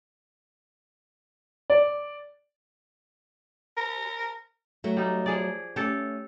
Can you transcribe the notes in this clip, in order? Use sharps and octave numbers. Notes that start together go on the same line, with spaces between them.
D5
A#4
F#3 A3
G3 D#4
F3 G#4 D5
A3 C#4 G4 A4